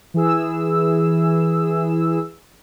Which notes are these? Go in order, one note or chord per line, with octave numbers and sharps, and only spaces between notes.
E3 G#4 E6